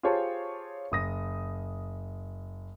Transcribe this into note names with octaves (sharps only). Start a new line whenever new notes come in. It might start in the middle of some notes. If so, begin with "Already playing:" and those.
F4 G4 G#4 C5 C#5 A5
F#1 D#6 A#6